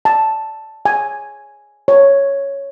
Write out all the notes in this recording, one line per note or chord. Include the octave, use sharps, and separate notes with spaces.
A5
G#5
C#5